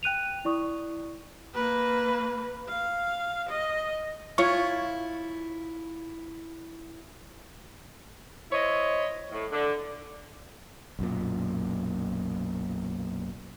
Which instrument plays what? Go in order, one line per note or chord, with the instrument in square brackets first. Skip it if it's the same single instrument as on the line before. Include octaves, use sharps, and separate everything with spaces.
[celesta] G5 F#6 D#7 F7
E4 D5 C#6 D#6
[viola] A#3 B4
F5
D#5
[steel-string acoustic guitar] E4 [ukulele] F4 [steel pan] C#5 C#6
[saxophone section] E4 C5 C#5 D#5
A2
D3
[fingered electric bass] B1 F#2 A#2